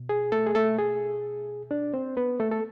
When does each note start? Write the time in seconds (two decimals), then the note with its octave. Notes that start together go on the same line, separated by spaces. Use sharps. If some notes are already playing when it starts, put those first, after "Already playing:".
Already playing: B2
0.09 G#4
0.32 A3 A4
0.47 G#4
0.55 A3 A4
0.79 G#4
1.71 D4 D5
1.94 C4 C5
2.17 B3 B4
2.40 A3 A4
2.52 A4